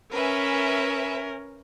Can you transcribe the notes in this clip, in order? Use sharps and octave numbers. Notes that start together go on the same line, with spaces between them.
C#4 A#4 B4 E5 G#5